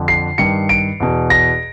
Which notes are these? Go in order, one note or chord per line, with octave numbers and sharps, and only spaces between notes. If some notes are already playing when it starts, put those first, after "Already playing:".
Already playing: F2 D3
C7
G2 D#3 C#7
D7
E2 B2
A#6